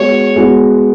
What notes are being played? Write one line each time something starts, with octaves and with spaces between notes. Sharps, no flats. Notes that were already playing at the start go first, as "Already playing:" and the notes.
Already playing: G#3 B3 F#4 C#5
G#3 B3 F#4